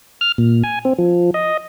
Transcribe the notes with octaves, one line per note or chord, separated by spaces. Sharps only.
F6
A#2
G#5
C4
F3
D#5